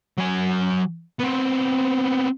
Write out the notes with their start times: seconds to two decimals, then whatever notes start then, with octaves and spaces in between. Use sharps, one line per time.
0.18 F#3 G#5
1.19 B3 C4